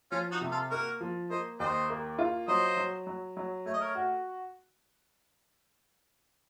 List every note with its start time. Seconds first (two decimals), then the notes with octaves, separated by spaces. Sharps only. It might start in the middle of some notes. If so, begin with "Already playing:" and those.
0.11 F3 C#4 F4
0.32 D#4 F#4
0.41 C3
0.51 F4 A4
0.70 A#3 F#4 A#4
1.01 F3
1.30 A#3 C5 D#5
1.59 D#2 C5 D#5
1.90 A#3
2.18 F4
2.48 F#3 C5 D#5
2.77 F#3
3.07 F#3
3.37 F#3
3.66 A3 C#5
3.74 D#5
3.81 A#4 C#5
3.95 F#4